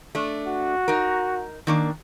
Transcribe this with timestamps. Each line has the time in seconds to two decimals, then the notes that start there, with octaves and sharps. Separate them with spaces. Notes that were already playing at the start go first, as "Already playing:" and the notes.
0.15 A3 D4
0.47 F#4
0.88 D#4 A#4
1.67 D#3 A#3 D4